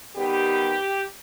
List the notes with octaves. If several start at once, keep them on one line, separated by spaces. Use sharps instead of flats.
D#3 G3 B3 G4